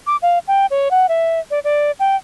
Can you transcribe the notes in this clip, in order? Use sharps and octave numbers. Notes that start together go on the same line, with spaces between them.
D6
F5
G5
C#5
F#5
E5
D5
D5
G5